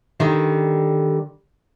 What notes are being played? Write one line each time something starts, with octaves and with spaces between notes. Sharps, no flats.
D3 D#3 G3